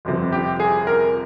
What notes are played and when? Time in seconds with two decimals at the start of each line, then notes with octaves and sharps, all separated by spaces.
0.05 G1 F2 C3 F3
0.32 G4
0.60 G#4
0.87 A#4